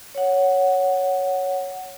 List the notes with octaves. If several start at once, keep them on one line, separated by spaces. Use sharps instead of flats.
C#5 F#5